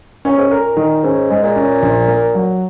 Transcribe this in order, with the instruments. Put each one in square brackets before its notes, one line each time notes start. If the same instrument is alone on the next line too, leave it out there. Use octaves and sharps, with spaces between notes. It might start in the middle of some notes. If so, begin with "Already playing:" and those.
[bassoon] A#2 [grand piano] C#4
[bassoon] G#2
[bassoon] A#2 [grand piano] A#4
[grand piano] D#3
[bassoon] G#2 [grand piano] C#4
[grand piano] G#3
[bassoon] A#2
[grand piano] C#4
A#1
A#3
F#3